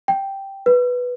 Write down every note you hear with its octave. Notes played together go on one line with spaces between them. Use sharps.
G5
B4